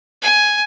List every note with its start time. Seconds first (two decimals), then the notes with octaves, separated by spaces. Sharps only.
0.22 G#5